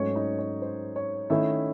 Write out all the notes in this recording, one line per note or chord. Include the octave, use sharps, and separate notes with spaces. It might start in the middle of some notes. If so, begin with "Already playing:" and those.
Already playing: G#2 F#3 A3 C#4 C#5
D#4 D#5
C#5
C5
C#5
D#3 A3 C#4 E4 E5